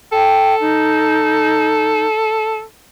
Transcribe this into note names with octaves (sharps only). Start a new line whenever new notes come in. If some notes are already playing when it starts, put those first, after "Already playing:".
A4 G5
D#4